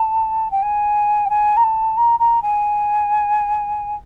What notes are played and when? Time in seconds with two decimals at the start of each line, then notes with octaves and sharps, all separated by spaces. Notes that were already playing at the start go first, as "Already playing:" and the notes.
Already playing: A5
0.51 G5
0.62 G#5
1.25 G5
1.29 G#5
1.57 A#5
1.63 A5
1.97 A#5
2.19 A#5
2.42 G#5